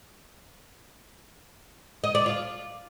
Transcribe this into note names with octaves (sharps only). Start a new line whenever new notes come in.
D#5
D5
F4